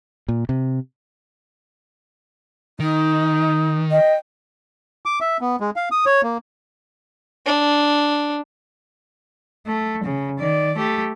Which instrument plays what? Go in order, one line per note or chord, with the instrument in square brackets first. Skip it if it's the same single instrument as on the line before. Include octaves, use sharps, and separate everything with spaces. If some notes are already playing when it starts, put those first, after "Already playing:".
[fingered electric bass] A#2
C3
[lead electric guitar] D#3 [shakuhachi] D#4
[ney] D#5 [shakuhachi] G5
[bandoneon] D6
E5
B3
G#3
F5
D#6
C#5
A#3
[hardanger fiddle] D4
[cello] A3
C#3
D#3 D5
A3 G4